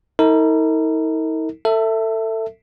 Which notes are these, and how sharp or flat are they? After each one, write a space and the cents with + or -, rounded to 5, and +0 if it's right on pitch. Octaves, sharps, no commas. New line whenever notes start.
D#4 +45 A#4 -45
A4 +25 E5 +0